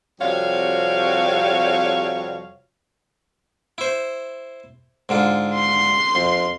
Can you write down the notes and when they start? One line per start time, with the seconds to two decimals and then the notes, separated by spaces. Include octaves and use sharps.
0.21 F2 C3 G3 F#4 C#5 F5
3.78 E4 C5
5.09 G#2 D3 F4
5.55 C6
6.15 F2